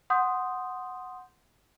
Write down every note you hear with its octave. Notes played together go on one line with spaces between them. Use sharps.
F#5 C6 D#6 G6